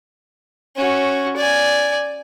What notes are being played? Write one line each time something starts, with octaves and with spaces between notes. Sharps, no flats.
C#4 F#4
D5 G#5